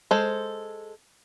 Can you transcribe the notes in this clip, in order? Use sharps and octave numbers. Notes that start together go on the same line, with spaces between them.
G#3 A4 C5